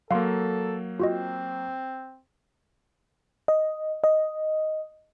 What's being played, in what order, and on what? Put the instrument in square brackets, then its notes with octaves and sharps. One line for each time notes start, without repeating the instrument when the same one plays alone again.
[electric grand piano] F#3 A#3 [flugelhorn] A4 [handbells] F5 C6
[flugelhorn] C4 [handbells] F4 F#4 D#5
[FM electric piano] D#5
D#5